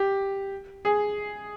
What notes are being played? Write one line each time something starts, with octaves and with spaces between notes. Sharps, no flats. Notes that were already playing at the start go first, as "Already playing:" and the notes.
Already playing: G4
G#4